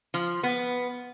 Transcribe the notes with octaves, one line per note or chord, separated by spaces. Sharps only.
F3
B3